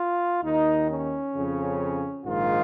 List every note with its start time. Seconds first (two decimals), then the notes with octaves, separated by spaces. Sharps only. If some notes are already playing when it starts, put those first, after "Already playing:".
Already playing: F4
0.43 D#2 D#3 D#4
0.89 C#4
1.34 F2 C#3
2.26 A#1 G#2 D#3 F4